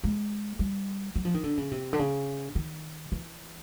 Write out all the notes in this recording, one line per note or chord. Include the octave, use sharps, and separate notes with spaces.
G#3
G3
F#3
F3
D#3
D3
C#3
C3
D3
C#3
D#3
E3